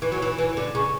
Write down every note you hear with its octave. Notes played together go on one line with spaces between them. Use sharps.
E3
F#3
E3
E3
D3
C#3